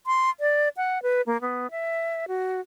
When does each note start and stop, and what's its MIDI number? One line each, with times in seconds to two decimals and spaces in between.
0.07 0.30 84
0.40 0.69 74
0.77 1.02 78
1.03 1.22 71
1.27 1.40 58
1.41 1.70 59
1.71 2.25 76
2.28 2.61 66